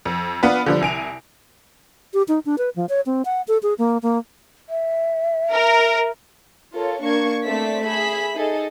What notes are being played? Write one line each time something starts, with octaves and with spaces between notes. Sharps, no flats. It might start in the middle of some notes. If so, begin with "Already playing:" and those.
F2
B3 D4 F4 B4
D3 F3 G3
C2 G#5 D7 F7
G4
D#4
D4
B4
F3
C#5
C4
F#5
A4
G#4
A#3
A#3
E5
A#4
F4 A4 A#4 C#5
A#3 D4 A#4 C#6 G#6
A3 C4 D5 E5 B6
G#4 E5 B5 B6
D#4 G#4 A4 D#5